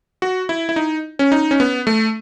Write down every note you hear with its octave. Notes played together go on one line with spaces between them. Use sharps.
F#4
E4
E4
D#4
C#4
D#4
C#4
B3
A3